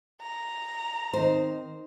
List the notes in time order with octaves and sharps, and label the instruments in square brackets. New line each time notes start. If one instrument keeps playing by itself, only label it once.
[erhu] A#5
[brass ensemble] D#3 C4 [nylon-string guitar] D#4 C5